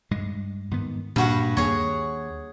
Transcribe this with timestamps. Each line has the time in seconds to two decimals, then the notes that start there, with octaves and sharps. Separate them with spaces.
0.11 G2 G#3
0.71 G#2 D#3 B3
1.16 G2 A#2 F#4 F#5
1.57 D#2 A#3 G#4 C#5